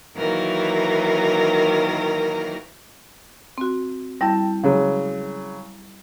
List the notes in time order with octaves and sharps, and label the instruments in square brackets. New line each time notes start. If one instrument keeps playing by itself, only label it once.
[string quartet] D#3 E3 F#3 A#3 A#4
[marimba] C4 F#4
[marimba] G3 E4 [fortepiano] G5 A5
[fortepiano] C#3 F#3 G#3